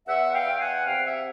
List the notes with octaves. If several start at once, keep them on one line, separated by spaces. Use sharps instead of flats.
E2 E5 F#5
F5 G5
E2
F#5 G#5
C3 F5 G5
E5 F#5